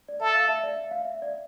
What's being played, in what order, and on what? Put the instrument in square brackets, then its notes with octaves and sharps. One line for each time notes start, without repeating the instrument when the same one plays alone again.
[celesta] D5
[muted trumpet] A4 [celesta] E5
[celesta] F5
E5
D5
E5
F5
E5
D5